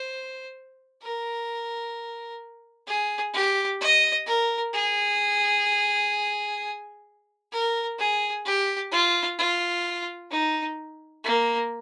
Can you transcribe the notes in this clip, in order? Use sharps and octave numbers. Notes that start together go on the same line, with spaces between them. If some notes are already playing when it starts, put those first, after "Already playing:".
Already playing: C5
A#4
G#4
G4
D#5
A#4
G#4
A#4
G#4
G4
F4
F4
D#4
A#3